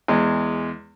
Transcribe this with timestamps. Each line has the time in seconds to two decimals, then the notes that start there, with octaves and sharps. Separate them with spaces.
0.08 E2 G#3